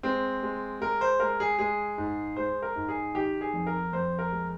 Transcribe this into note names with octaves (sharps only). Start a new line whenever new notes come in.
G#3 C4
G#3
G#3 A#4
C5
G#3 A#4
G#4
G#3 G#4
G#2
G#3 C5
A#4
G#2
G#4
D#3 G4
G#4
F2
A#4
F2 C5
A#4
G#3